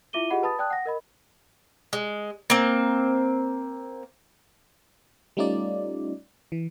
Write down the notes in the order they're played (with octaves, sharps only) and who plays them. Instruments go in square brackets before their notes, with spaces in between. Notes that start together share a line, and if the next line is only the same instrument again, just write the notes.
[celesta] E4 F4 E5 D6 D#7 G7
F4 G4 G#4 D#5 F#5 B5
B4 A5 B5 D#6 A6
D5 G5 A5 D#6 F#6
F#5 A#6
A#4 D#5 B5
[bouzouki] G#3
A#3 C4
[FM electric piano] G3 A3 C#4 D#4 F4 D5
E3